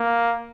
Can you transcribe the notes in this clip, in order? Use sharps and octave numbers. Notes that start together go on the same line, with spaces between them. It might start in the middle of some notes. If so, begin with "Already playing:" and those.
Already playing: A#3